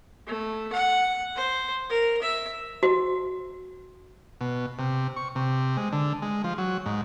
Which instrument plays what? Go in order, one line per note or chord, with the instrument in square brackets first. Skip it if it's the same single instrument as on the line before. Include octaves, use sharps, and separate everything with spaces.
[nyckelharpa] A3
F#5
C5
A#4
E5
[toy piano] F#4
[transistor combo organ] B2
C3
C#6
C3
G#3
D3
G#3
F3
F#3
G#2